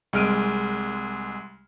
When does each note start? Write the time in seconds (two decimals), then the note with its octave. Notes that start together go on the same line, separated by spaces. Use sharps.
0.13 C2 G#3 F6 D7 D#7